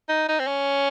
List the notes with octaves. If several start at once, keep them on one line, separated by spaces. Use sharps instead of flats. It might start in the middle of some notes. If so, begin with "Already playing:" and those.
D#4
D#4
C4
C#4